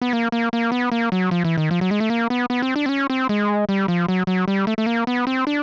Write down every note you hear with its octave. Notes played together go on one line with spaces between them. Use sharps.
B3
A#3
A#3
A#3
B3
A#3
F#3
F3
E3
D#3
F3
F#3
G#3
A3
A#3
B3
B3
C4
D4
C4
C#4
C4
G#3
G3
F3
F#3
F#3
G3
A3
A3
A#3
B3
C4
D4